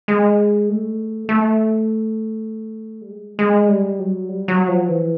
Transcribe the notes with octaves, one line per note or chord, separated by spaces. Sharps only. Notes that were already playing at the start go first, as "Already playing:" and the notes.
G#3
A3
A3
G3
G#3
G#3
G3
F#3
G3
F#3
F3
E3